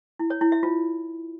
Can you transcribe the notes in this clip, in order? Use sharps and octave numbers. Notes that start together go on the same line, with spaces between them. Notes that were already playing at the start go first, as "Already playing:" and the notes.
E4
C#5
E4
E5
F4